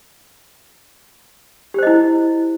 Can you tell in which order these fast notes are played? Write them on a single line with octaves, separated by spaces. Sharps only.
G4 C5 D#5 E4